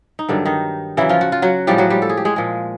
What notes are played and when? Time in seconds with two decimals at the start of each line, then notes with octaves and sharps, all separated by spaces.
0.19 D#4
0.29 G2 D3 D#3 F#3 D4
0.45 D#3 D#4
0.97 C#3 E3 F#3 E4
1.09 F3 F4
1.21 F#4
1.32 F4
1.42 F#3 F#4
1.67 A2 F3 G3 G#3 G4
1.78 F#3 F#4
1.90 G3 G4
2.02 A4
2.09 G#4
2.17 G4
2.25 G#3 G#4
2.36 A#2 F3 G#3